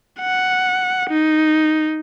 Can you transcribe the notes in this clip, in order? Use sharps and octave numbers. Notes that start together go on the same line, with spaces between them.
F#5
D#4